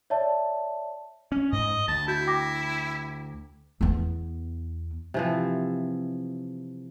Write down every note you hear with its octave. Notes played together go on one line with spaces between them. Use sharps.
C#5 D5 E5 A5
C#4
G#2 D#5
D2 A5
E4 F#4 G6
G5 D6 A#6
E2 B3
C3 E3 F3